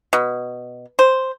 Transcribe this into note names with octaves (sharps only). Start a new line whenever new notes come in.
B2
C5